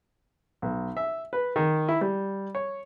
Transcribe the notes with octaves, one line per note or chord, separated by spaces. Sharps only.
B1
E5
B4
D#3
E4
G3
C#5